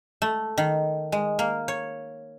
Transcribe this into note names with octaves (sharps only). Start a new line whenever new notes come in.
A3
D#3
G#3
A#3
C#5